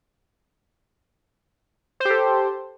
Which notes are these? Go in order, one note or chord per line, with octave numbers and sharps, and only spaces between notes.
G4 A4 C5